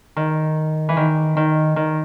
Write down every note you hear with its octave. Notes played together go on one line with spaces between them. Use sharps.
D#3
E3
D#3
D#3
D#3